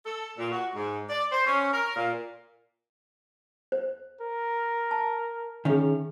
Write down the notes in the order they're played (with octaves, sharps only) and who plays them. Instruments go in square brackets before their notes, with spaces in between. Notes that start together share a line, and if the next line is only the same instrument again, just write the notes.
[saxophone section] A4
A#2
F#4
G#2
D5
C5
C#4
A#4
A#2
[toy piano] C5
[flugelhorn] A#4
[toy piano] A5
[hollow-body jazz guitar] D#3 C#4 [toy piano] G#4 E5